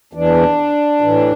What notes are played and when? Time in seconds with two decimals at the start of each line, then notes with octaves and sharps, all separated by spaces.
0.13 E2 E3 D4
1.01 A2 E3